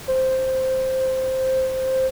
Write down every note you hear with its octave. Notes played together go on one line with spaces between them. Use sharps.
C5